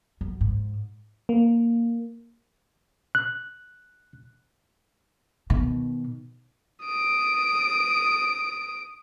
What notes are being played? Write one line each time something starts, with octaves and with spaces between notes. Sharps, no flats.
F#2
G#2
A#3
F#6
B2 D#3
D#6 D7